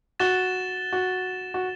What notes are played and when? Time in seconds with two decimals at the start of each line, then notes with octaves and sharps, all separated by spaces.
0.20 F#4 A6 E7 G7
0.93 F#4
1.54 F#4